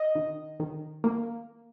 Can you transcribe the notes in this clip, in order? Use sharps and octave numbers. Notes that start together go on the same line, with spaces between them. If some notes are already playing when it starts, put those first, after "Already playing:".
Already playing: D#5
D#3
D#3
A#3